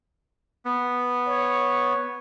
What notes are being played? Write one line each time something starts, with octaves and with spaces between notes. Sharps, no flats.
B3
C#5